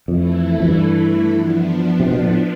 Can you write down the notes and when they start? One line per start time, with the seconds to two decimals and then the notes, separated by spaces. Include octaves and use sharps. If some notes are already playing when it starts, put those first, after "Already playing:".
0.08 F2 E3 A3 E4
0.59 F2
0.69 G2
1.28 F3 B3 D4
2.00 C3
2.11 B2
2.24 A2